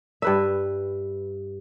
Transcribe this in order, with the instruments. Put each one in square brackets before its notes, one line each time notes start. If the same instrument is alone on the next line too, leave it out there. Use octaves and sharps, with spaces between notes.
[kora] G2 B4 E5